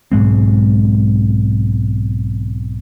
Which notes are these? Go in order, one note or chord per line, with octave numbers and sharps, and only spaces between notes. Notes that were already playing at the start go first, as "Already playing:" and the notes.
B1 G#2 G#3 C4